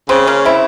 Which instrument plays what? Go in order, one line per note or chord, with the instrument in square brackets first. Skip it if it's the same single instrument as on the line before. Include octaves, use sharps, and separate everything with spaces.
[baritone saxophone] C#3 [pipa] G#3 C4
[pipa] A#3 C#4
C4 E4